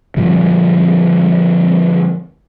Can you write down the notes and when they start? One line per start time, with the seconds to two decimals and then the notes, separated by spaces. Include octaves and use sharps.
0.17 A#2 D3 F3 G3